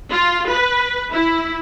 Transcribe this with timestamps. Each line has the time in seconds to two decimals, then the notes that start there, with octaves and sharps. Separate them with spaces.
0.11 F4
0.49 B4
1.11 E4